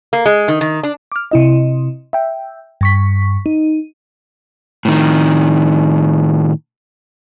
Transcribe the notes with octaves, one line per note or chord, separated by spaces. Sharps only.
A#3
G#3
D#3
D#3
D4
D6 F6
C3 E4 D#5
E5 G5
G2 C#6 B6
D#4
A2 D#3